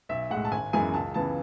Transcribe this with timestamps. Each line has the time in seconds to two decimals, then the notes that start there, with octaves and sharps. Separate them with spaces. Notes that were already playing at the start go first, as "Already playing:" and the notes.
0.09 B1 E5
0.30 A2 G#3 F#5
0.45 A5
0.52 G#1 G#5
0.73 F#2 E3 G#3 B3 G#5
0.94 C#2 A5
1.14 C#3 E3 B3 A5